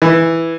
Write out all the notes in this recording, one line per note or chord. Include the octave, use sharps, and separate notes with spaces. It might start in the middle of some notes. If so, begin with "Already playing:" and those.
E3